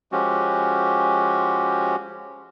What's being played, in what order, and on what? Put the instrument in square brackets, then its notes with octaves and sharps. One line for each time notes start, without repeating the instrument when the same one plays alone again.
[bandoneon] F3 G#3 C#4 F#4 G4